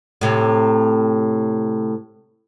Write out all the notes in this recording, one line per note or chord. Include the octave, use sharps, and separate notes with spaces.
A2 C3